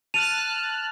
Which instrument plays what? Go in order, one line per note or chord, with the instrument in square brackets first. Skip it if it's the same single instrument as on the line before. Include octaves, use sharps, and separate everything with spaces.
[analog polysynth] A5 F6 F#6 [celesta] D#7 F7